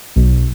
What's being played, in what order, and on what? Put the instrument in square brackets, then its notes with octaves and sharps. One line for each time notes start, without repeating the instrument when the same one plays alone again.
[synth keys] B1